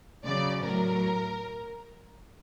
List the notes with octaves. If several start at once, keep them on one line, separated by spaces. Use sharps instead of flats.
C#3 F#3 D5
A2 F#3 A#4